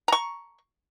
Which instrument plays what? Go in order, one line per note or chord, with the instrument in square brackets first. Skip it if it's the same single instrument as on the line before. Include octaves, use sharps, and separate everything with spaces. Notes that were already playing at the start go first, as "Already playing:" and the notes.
[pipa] A#5 C#6